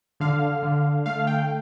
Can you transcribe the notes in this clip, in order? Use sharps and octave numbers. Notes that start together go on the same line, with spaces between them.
D3 F5
D3
A3 F5
G5